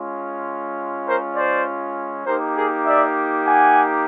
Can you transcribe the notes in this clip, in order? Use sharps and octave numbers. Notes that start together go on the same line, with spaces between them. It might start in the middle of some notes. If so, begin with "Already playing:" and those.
Already playing: G#3 C#4 F4
A#4 C5
C5 D5
A#3 D#4 G4 A#4 C5
G#4 A#4
D5 E5
F#5 G#5